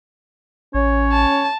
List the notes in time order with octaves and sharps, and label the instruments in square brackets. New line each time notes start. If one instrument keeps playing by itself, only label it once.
[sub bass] A1 [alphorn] C#4 [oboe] C#5
[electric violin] A5